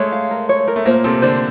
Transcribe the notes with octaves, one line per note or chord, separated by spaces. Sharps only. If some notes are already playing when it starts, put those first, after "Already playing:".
Already playing: G#3 A3 C#5
F5
A#4
C#5
A#4
A3
A#2 A#3 C5
C3 C4 A4
D3 D4 C5